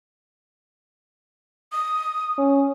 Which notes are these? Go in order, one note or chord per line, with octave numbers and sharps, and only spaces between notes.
D#6
C#4